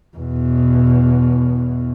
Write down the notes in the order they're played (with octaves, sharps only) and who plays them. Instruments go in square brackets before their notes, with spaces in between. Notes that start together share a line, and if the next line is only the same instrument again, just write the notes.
[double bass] E2 B2